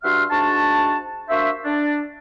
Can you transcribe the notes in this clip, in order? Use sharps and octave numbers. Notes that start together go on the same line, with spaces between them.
G2 F#4 E5 F#5 C6 F6
G#2 D4 F#4 A5
A#3 D4 F#4 C5 E5
D4